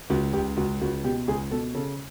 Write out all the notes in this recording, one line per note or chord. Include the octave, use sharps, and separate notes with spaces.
C#2 F#4
C#2 G4
C#2 F#4
C#2 F#4
B2 G4
C#2 G#4
B2 A4
C#3 A4